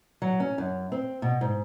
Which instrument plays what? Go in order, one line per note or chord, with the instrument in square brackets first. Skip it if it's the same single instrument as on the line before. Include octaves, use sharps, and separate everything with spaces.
[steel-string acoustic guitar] F#3
C#4
F#2
C4
B2
G#2